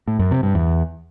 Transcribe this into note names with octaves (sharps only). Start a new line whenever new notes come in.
A2
F#2
C3
G2
E2